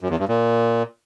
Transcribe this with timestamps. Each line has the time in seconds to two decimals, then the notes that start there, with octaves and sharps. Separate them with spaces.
0.01 F#2
0.10 E2
0.19 G2
0.28 A#2